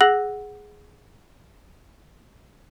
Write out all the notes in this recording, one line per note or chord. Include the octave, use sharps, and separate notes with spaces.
G#4 F#5 E6 F#6 A#6 F#7